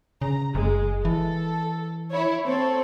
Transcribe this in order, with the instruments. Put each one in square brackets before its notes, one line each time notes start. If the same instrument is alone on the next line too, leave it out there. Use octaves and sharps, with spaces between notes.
[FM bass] C#3 [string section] A#5
[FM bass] F#1 [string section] G#3
[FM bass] E3 [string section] A4
[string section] E4 C#5
C4 A4 C#5